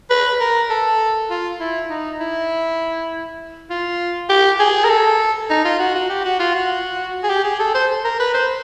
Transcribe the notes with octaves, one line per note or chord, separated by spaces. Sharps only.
B4
A#4
A4
F4
E4
D#4
E4
F4
G4
G#4
A#4
A4
D#4
F4
F#4
F#4
G4
F#4
F4
F#4
G#4
G4
G#4
A4
C5
A#4
B4
C5